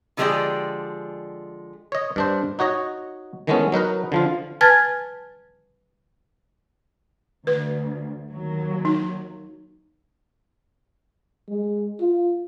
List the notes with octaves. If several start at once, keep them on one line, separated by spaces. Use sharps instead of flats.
D3 F3 G#3 C4 G4 D5
C#5 D#5
G2 D4 C5
D#4 F#4 C#5 D#5
D#3 E3 G#3 A3 B3 C#4
F#3 D#4 A#4 B4
D3 F3 F4
B4 G#5 A5 F6 G#6 A6
D2 B4
D#2 F#3
D#4
G#3
F4